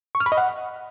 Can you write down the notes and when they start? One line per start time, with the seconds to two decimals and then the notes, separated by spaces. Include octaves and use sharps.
0.15 C#6
0.20 F6
0.26 B5
0.32 D#5
0.37 F#5